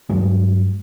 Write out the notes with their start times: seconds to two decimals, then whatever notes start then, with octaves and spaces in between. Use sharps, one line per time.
0.09 G2 F#3 G#3